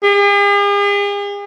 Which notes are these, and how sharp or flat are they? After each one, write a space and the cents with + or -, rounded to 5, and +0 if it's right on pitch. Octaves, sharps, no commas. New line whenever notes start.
G#4 -45